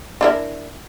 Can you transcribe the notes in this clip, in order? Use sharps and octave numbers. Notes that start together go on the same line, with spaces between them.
D4 E4 A#4